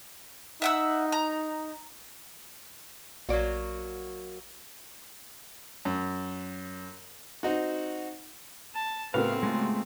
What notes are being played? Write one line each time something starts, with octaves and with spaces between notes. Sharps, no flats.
D#4 E5 F#5 E6
A#5
A#1 F#3 A#3 F#4 D5
F#2
C4 D#4 F#4
A5
A2 C#3 B3 C4 F#4 A#4 B4 F5
G#3 A3 F4